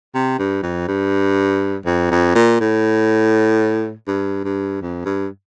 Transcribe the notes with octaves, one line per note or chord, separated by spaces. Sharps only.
C3
G2
F2
G2
F2
F2
A#2
A2
G2
G2
F2
G2